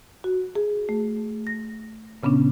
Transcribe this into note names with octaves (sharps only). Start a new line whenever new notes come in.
F#4
G#4
A3
A#6
A#2 C#3 B3 C#4 D4